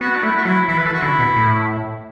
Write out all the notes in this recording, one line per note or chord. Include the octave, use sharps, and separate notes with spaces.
B3 F#4
D4
A3 E4
F#4
F#3 E4
E3 E4
B4
E3 A4
F#4
D3 E4
B2
A2